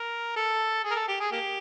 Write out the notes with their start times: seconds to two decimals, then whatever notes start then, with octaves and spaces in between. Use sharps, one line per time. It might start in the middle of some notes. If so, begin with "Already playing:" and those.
Already playing: A#4
0.36 A4
0.84 G#4
0.91 A#4
0.96 A4
1.08 G4
1.20 G#4
1.32 A#3 G4